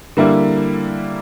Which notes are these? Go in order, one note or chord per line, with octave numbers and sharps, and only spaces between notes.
D3 G3 A#3 E4